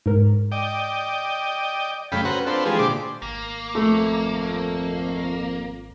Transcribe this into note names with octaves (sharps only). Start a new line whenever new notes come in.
G#2 A#4
D5 D#5 G5
F#2 C#3 A3 F5 G5 B5
C#4 F#4 B4 C5 F#5 A#5
C4 D4 F4 A4 B4 C5
E3 F3 G#3 F4 G4 G#4
A#2 D3 G4 C5 D5 D6
G#1 A#3
F2 A3